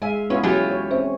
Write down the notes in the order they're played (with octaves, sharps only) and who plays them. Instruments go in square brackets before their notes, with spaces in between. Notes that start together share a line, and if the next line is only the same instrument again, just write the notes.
[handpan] G#3 E5 F5 [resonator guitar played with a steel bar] G#5
[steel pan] B3 E4 F4 [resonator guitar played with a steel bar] C#4
[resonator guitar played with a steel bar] E3 F4 G4 [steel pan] F#3 [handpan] C#4
[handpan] C#5
[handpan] C4 C#4 [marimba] C5 E5